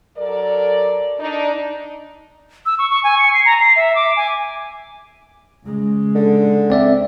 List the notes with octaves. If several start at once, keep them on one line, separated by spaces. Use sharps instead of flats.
F#3 A4 A#4 D5
D4 D#4 D5
E6
C#6
C#6
G#5
C#7
C7
A#5
C7
E5
D6
G#5
C#3 G#3
D3
C4 D5 E5